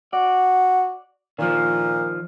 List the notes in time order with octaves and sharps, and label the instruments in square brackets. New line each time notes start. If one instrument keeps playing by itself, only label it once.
[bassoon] F#4 [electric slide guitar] D5
[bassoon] A#2 [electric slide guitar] D#3 F3